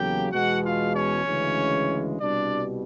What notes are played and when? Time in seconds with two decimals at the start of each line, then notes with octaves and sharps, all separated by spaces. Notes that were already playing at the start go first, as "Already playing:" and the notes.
Already playing: E2 C#3 F#3 A#3 G4 G5
0.32 E2 B2 G#3 F#4 F#5
0.63 F4 F5
0.94 C#4 C#5
1.26 D2 C#3 E3 G#3
2.20 C2 B2 G3 D4 D5